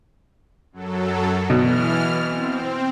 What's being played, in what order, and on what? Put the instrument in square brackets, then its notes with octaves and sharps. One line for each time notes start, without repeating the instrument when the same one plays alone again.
[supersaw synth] F#2 F#3 A4
[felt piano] B2 [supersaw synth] E3 F6
[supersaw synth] C4